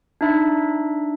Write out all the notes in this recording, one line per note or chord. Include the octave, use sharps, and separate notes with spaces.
D4 D#4 E5 B5